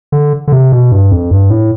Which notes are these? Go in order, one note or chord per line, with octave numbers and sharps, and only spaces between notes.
D3
D3
C3
B2
G2
F2
G2
A2